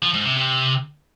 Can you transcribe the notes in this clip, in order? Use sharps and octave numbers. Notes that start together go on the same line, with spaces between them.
F3
G#2
C3
C3